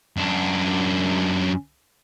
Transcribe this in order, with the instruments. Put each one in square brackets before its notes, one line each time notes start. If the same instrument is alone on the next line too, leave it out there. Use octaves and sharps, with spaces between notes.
[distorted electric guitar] F#2 D4